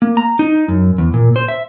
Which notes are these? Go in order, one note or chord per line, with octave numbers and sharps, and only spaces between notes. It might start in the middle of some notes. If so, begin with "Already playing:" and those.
A#3
A#5
D#4
F#2
E2
A#2
C5
E5